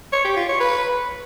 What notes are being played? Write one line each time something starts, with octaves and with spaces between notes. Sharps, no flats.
C#5
G4
F4
C#5
B4